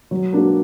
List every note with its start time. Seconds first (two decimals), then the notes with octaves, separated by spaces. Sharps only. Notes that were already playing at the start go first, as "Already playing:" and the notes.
0.11 F#3
0.32 A#3 D4 F#4